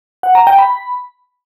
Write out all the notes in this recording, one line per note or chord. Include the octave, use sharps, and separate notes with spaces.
F#5
A#5
G5
B5